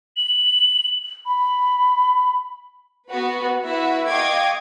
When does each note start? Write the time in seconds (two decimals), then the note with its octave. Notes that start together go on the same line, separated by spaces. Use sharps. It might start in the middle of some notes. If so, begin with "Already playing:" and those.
0.17 F#7
1.26 B5
3.09 B3 F#4 B4
3.65 E4 F#4 B4 E5
4.09 D#5 F5 G5 C#6 D6 G#6